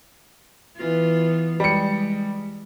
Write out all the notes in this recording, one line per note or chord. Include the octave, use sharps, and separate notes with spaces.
E3 B3 F4
G3 G#3 C#7